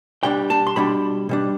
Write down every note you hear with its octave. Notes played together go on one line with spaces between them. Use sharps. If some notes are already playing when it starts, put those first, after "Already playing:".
B2 G3 D4 G5
A5
C6
B2 G3 D4 B5
B2 G3 D4